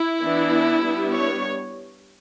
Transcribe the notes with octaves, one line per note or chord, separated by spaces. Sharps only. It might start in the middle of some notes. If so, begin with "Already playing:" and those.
Already playing: E4
E3 B3 D4
G3 B3 D4
C#5